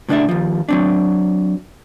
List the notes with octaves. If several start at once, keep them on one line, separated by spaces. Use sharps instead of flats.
A2 C#3 D4 C5 D5 E5
D#2 F3
F#3 C4 D4